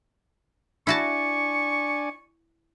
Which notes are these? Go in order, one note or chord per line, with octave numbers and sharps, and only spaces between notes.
D4 E4 F#4 D5 G#5 A5 C#6